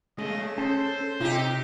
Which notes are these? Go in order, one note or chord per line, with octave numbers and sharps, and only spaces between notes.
C#3 G#3 A3 D#5
C#4 A4 C5
C3 D#4 F4 G4